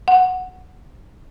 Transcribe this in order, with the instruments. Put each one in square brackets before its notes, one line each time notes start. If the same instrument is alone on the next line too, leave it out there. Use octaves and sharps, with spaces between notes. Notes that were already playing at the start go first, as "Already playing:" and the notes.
[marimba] F#5